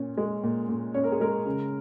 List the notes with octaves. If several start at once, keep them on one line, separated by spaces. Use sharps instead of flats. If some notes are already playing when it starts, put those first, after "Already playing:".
Already playing: A#2 C#4
G#3
A#2
A#2
C#4 C#5
A#4
G#4
G#3 A#4
C#3